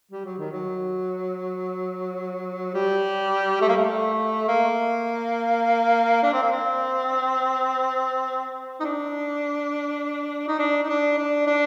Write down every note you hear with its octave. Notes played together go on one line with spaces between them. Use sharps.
G3
F#3
D#3
F#3
G3
A3
A#3
A3
A#3
D4
C4
A#3
C4
D#4
D4
D#4
D4
D#4
D4
D4
D4